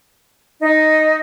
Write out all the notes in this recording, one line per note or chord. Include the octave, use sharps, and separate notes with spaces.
D#4